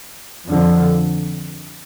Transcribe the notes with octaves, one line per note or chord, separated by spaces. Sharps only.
F2 D3 F3